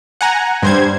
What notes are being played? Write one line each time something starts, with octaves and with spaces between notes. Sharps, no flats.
F#5 G#5 A#5
G2 C5 G#6